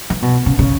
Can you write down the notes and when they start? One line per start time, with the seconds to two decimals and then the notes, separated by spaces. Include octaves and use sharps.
0.10 E3
0.22 B2
0.46 C#3
0.59 C#3